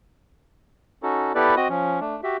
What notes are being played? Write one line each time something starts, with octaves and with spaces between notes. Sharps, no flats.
C#4 D#4 F#4 A4
B3 E4 G4 A4 B4 D5
C4 F#4 D#5 D#6
F3 C#4
A3 D4
F#4 G4 E5